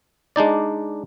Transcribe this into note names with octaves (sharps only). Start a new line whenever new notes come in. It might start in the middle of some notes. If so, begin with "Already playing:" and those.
G#3 D4 D#4 D5